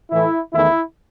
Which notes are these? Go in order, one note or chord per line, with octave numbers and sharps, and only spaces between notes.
A2 E3 A3 E4
E2 D#3 A3 E4